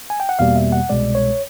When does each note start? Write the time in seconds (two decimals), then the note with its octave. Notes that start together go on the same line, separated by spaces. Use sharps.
0.10 G#5
0.20 G5
0.29 F#5
0.39 E2 B2 G3 A#3 F5
0.56 E5
0.72 F#5
0.89 C2 B2 G#3 D5
1.15 C#5